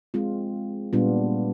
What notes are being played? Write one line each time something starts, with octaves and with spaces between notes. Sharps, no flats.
G#3 C4 F4
A#2 G3 B3 D4 F4